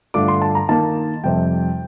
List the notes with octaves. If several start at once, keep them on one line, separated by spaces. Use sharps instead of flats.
G2 D3 A3 D4 F4 D6
C6
A5
A#5
D#3 A#3 D#4 A5
F2 C3 G3 G5